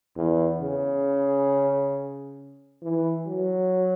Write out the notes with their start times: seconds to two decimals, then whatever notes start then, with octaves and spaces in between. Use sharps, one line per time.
0.16 E2
0.61 C#3
2.82 E3
3.27 F#3